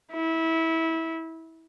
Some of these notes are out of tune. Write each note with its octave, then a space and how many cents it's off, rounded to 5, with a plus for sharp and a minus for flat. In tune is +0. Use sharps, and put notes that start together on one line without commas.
E4 -20